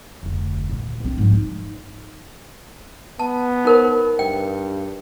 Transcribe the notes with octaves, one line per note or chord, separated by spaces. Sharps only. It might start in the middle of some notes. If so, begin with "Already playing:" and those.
F1 D2
A#1 D#2
C4 D4
G#2 F3
D#4
B3 A5
D#4 A#4 C5
G2 G5